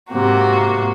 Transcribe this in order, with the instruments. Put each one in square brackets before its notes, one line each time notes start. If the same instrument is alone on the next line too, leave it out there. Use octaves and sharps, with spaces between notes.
[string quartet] G#2 C3 A#3 F#4